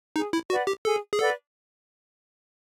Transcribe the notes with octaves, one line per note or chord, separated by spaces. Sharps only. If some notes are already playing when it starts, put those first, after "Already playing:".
D#4 G#4
E4
F#4 B4 D5 F#5
G4
G#4 A4
G#4
A4 B4 D5 F#5